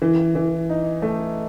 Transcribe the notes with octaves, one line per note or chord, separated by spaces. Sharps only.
E3
E3
D#4
A3